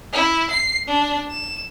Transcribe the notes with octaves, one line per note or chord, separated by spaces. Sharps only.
E4
C7
D4
E7